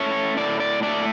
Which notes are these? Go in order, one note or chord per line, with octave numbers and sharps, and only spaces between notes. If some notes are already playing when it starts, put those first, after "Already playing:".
Already playing: A3 C#4 C#5
A2 D5
D5
A3 D5